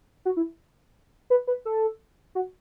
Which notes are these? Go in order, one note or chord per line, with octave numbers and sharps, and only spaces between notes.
F#4
E4
B4
B4
A4
F#4